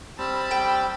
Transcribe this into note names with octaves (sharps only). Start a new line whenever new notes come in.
G3 C4 A5 B5
G5